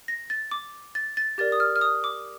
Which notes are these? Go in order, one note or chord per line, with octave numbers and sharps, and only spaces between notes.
A#6
A6
D6
A6
A6
G4 A#4 D5 A6
D#6
F6
F6
D#6
D6